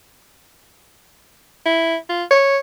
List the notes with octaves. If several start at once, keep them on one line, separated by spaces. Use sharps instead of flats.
E4
F4
C#5